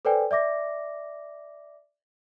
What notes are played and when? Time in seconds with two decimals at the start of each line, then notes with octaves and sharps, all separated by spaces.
0.05 A4 B4 C5 D5 G5 G#5
0.31 D5 E5 D6 A#6